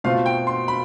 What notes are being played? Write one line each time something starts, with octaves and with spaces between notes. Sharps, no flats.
B2 A3 C4 F4 F5
G5
C6
B5